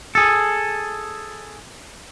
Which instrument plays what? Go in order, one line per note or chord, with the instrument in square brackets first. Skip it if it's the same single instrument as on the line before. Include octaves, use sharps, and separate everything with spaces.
[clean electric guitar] G#4 A4